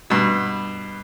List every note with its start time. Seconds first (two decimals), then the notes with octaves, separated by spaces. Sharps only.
0.10 G2 B2